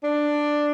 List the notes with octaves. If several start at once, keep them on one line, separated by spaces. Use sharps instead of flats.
D4